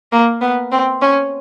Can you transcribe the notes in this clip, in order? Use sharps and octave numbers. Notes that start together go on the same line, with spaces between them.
A#3
B3
C4
C#4